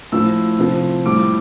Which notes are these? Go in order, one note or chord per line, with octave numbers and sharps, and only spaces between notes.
A2 F3 E6
C3 F3
A2 G3 D6